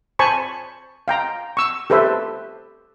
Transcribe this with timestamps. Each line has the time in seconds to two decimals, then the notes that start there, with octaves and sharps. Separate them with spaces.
0.19 C5 G#5 A5 B5 C#6
1.08 F5 G5 A#5
1.57 C#6 E6
1.90 G4 A4 B4 C5 E5